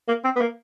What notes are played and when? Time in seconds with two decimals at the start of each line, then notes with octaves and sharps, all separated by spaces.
0.08 A#3
0.24 C4
0.36 B3
0.41 A#3